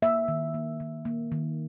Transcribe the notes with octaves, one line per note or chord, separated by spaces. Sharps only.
A#3 E5
D#3
A#3
D#3
A#3
D#3